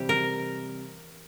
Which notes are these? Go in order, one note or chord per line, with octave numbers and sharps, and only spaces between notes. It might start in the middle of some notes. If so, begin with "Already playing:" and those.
Already playing: C3 E3 G3 C4 G4
A#4